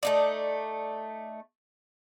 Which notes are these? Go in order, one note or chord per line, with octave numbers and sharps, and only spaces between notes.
A3 D#4 D5